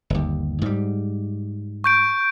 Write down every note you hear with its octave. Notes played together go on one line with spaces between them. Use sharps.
G1 D#2
G#2 G3
C#6 G6 D7